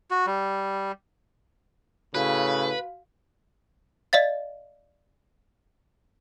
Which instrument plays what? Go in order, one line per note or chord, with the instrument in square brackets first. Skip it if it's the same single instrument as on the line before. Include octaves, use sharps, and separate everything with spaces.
[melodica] F#4
G3
[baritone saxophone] A2 [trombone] C#3 [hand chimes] F#4 F5 [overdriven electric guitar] B4
[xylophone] D5 D#5 F5 A6